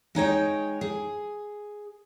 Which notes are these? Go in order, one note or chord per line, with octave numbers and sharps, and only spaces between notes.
G#3 D#4 C#5 G5
G#4